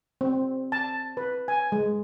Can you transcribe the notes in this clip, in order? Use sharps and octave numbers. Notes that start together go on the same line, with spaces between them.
C4
A5
B4
G#5
G#3